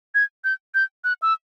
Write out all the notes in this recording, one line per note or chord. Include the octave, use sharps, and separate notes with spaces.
G#6
G6
G6
F#6
E6